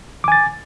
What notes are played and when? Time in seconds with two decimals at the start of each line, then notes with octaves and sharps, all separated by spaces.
0.24 D6
0.28 G#5
0.32 A6